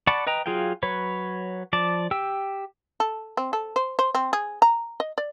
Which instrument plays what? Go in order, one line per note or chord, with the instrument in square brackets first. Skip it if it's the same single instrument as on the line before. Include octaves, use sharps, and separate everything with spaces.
[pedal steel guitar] D5 F#5 A5 B5 C#6
B4 D#5 G5 A#5
F#3 F4 G#4 F5 G5
F#3 B4 C#5
F3 D5 A5
G4 G5 E6
[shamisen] A4
C4
A4
C5
C5
C4
G#4
A#5
D#5
D5